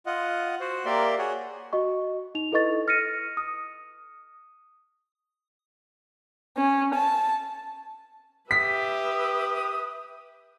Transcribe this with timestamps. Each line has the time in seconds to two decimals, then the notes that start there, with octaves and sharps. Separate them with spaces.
0.06 F4 D#5 F#5
0.60 F#4 C5 F#5
0.85 A#3 G4 A#4 D5 E5 C6
1.18 F#4 G#4 C#5 F#5
1.73 F#4 D#5 C#6
2.35 D#4 F7
2.52 E4 A4 B4 D#5 C#6 A6
2.88 F6 A#6 C#7 D#7
3.37 D#6
6.57 C#4
6.94 A5
8.51 G4 B4 E5 D#6 B6